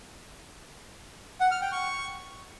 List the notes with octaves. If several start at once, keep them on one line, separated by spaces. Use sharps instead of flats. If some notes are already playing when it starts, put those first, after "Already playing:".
F#5
F6
G5
C#6